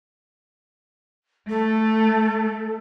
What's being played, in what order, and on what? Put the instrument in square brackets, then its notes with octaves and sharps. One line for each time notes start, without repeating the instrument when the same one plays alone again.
[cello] A3 [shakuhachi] A4